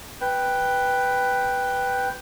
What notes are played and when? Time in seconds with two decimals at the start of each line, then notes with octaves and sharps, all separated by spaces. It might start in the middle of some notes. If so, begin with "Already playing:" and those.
0.21 B4 G5